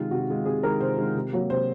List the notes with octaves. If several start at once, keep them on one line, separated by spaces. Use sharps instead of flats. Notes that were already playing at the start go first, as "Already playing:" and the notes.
Already playing: C3 D#3 G#3 F4
C3 F#4
D#3 G#3
C3 G#4
D#3 G#3 A#4
C3 C5
D#3 G#3
C3
F#3 A#3
C3 C5